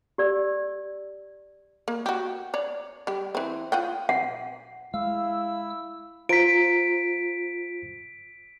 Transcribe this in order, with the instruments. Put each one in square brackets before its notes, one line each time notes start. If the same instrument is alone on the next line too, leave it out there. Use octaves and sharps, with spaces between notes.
[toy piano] G4 D5 E6
[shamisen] A#3
F#4 G4
C#5 D5
G3 G4
E3 C4
F4 F#5 G5
[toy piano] F#5
[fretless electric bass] G#3 [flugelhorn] E4 [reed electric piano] F5 [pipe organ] E6
[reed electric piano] F4 C5 A#5 [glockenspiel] B6 D7